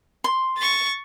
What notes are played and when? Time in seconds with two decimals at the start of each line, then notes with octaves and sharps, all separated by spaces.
0.24 C6
0.57 C#6 A6